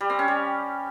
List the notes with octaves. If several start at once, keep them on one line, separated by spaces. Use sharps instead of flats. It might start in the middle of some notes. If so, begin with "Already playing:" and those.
G3
C4
C#4
G3